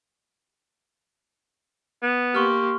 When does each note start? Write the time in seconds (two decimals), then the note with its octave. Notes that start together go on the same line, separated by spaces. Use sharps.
2.03 B3
2.35 A#3 G4 C6 C#6 F6